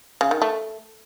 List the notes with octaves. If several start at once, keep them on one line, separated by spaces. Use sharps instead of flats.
C#3
D#3
A3